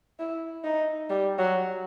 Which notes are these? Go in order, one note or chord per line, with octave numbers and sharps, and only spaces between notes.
E4
D#4
G3
F#3